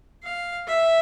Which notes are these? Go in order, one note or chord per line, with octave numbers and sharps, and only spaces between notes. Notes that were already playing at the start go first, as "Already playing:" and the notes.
F5
E5